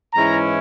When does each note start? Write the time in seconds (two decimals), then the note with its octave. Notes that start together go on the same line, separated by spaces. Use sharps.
0.13 G#2 E3 G#3 C#4 E4 A#5